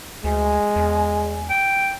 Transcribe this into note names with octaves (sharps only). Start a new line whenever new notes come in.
D2 G#3 G#5
E2
G5